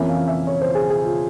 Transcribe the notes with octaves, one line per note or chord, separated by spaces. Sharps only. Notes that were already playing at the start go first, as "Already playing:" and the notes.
Already playing: F2 E3 A#3 C#4 E4 E5
F5
E5
C#5
C5
G#4
G#4
F4